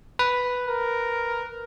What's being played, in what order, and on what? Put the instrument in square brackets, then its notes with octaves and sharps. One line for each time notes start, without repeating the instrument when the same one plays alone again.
[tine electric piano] B4
[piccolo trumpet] A#4